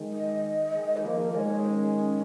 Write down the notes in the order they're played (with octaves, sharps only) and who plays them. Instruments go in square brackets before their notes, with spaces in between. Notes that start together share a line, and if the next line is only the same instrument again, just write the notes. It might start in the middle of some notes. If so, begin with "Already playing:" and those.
Already playing: [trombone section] D#3 G#3
[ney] D#5
[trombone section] D#3 G#3
[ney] D#4
[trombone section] F3 A#3 [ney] F4
[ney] G#4
A#4
[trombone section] D#3 G#3 [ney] D#5
[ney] C#5
C#4
C#4